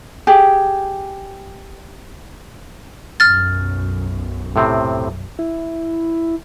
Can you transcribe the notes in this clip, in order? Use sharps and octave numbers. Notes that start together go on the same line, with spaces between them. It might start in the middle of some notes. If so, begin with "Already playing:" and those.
G4 G#4
B1 F#2 F6 A6
A2 C3 C4
E4